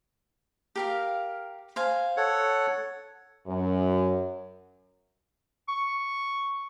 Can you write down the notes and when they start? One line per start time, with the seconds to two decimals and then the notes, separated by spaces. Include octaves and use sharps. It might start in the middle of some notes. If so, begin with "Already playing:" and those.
0.76 G4 A#4 F5
1.76 C5 F5 G#5
2.17 A4 C#5 F#5
3.47 F#2
5.68 C#6